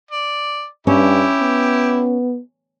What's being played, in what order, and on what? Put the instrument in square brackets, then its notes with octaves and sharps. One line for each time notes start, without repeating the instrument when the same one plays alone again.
[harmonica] D5
[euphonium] G2 [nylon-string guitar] C#4 [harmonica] E4 G4
[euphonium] B3